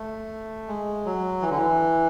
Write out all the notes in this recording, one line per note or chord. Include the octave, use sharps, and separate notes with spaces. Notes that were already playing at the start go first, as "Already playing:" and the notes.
Already playing: A3
G#3
F#3
E3
D3
E3